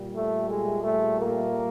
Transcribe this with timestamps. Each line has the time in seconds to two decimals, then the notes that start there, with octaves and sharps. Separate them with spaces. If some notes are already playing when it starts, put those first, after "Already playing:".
Already playing: A#2 G3
0.15 A3
0.49 G#3
0.83 A3
1.18 A#3